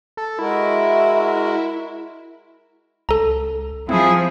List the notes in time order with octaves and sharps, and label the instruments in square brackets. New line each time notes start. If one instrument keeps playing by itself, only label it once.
[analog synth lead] A4
[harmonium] G#3 F#4 A#4 [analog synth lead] E4
[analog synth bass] C#2 [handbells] A4 A#5
[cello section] F3 [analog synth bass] C4 [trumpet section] E4 G#4